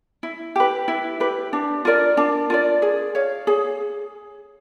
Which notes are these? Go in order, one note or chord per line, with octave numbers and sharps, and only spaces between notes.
E4
G4 B4
E4
G4 B4
D4
F4 A#4 D5
D4
F4 A#4 D5
G#4
C#5 F5
G#4